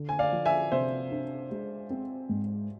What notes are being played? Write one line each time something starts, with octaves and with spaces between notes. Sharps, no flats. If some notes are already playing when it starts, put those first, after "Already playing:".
Already playing: D3
G#5
D5 F5
F3
E5 G#5
C3 C5 E5
D4
G#3
C4
G#2